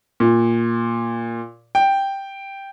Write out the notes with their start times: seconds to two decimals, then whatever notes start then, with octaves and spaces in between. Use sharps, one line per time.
0.20 A#2
1.75 G5